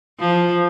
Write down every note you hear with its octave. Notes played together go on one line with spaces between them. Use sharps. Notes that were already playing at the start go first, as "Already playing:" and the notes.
F3